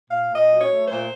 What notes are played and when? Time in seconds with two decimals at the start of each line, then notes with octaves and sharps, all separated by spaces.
0.09 A#2 F5
0.29 A#2
0.36 D#5
0.49 F#3
0.61 C#5
0.69 A3
0.88 A#2 C5